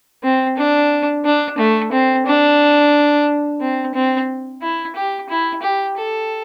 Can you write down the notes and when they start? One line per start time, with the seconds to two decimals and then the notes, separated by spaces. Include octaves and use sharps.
0.23 C4
0.57 D4
1.25 D4
1.58 A3
1.92 C4
2.26 D4
3.61 C4
3.94 C4
4.62 E4
4.96 G4
5.29 E4
5.62 G4
5.97 A4